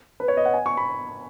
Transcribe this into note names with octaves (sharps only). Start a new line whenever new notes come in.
B4
C#5
D#5
F#5
G#5
C#6
B5